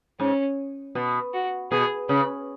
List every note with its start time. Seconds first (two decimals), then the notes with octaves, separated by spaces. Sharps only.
0.20 G#2 C#4
0.95 B2
1.34 F#4
1.72 B2 G#4
2.09 C#3 B4